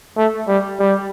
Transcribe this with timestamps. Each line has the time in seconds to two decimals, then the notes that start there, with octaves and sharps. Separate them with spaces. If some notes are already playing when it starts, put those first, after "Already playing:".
0.17 A3
0.48 G3
0.79 G3